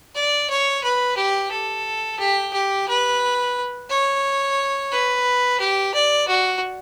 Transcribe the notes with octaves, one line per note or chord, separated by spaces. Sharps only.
D5
C#5
B4
G4
A4
G4
G4
B4
C#5
B4
G4
D5
F#4